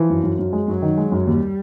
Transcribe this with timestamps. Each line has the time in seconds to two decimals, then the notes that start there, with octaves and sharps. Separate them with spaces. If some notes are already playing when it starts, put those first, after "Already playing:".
Already playing: E3 F3
0.10 F#2
0.23 F#2
0.39 F#2
0.53 G#3
0.67 F#2 F#3
0.82 D#3
0.98 G#3
1.12 F#2
1.27 D#2 G3